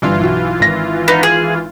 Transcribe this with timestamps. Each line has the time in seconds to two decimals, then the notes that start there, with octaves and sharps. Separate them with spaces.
0.02 G1 G2 E3 F4 C6
0.19 B1 F#4
0.60 G#1 A#6
1.08 B3 D#4
1.23 G#4